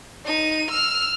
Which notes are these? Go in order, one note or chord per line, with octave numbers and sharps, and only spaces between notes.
D#4 D#7
E6 F6